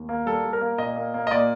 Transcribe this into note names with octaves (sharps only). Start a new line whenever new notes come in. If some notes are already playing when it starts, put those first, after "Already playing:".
Already playing: D#2
A#3
G3 A4
G3
A#4
A#3
A#2 D#5
A#3
A#3
D#5
A#2 D5